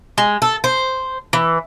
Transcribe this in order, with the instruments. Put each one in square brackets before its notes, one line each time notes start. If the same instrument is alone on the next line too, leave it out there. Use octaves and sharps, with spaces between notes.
[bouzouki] G#3
A4
C5
E3